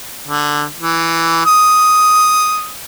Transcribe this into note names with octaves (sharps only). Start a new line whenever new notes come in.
D3
E3
D#6